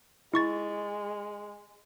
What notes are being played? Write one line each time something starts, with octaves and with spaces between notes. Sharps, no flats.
G#3 E4 C#6 A6